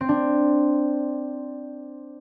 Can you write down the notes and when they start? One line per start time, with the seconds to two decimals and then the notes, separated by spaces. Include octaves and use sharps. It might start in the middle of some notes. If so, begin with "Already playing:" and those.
0.01 C4
0.09 D4